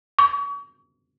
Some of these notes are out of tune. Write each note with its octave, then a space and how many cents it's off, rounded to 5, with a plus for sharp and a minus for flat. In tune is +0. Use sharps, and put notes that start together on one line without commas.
C#6 +40